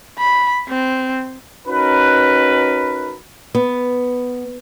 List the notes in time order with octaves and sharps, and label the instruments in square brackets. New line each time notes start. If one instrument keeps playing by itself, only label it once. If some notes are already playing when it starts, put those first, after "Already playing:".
[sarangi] B5
C4
[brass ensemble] C#4 D#4 F#4 A#4 B4
[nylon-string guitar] B3